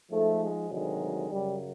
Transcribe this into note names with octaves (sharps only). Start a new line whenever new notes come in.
G#2 F3 A3
G#3
D2 C3 D#3 F#3 G#3
F#2 C#3 F#3 G3